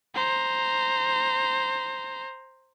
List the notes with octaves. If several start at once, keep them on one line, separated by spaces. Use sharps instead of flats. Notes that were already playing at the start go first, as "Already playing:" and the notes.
C5 A#5